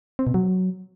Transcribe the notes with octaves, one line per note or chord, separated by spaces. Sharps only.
C4
B2
F#3